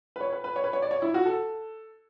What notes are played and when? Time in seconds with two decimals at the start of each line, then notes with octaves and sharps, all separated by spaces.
0.16 B4
0.21 C#5
0.33 B4
0.44 B4
0.56 C#5
0.64 B4
0.73 C#5
0.82 D5
0.91 C#5
1.02 E4
1.14 F#4
1.25 A4